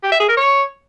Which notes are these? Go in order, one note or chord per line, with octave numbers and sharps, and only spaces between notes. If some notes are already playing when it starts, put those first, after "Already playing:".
G4
E5
G#4
A#4
C#5